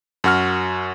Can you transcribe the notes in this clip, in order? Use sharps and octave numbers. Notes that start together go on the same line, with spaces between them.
F#2 F#4 F6